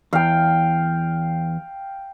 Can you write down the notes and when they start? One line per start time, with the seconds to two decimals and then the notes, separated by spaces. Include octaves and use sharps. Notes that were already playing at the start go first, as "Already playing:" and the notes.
0.13 E2 F5 G5